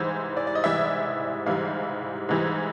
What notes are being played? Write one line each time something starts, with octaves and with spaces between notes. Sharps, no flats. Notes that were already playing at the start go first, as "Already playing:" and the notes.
Already playing: G#2 E3 G3 C5
D5
D5
D#5
G#2 E3 G3 E5
G#2 E3 G3 F5
G#2 E3 G3